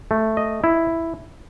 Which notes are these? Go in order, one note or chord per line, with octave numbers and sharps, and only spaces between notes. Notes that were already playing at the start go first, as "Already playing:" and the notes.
A3
D#5
E4